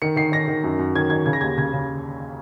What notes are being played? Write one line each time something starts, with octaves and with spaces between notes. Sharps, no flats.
D#3 C#7
D#3 C7
D#3 A#6
D#3
F#2
F#2
D#3 G#6
D#3 G#6
C#3 G#6
A#6
D#2 G#6
C#3 G#6
C#3